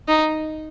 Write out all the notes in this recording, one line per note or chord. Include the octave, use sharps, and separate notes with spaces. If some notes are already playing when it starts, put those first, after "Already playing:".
D#4